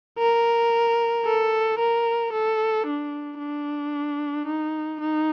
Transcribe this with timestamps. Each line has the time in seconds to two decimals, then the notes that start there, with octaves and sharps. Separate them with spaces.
0.19 A#4
1.25 A4
1.79 A#4
2.33 A4
2.87 D4
3.39 D4
4.47 D#4
5.00 D#4